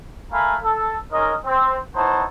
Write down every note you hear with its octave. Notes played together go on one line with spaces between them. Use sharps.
A3 A#4 F5 G#5 B5
A4
G#3 C#4 D#4 A#4 D#5
C4
B3 D#4 E4 C5 C#5 A5